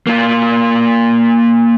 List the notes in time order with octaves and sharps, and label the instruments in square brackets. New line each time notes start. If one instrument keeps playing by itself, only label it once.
[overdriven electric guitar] A#3 F4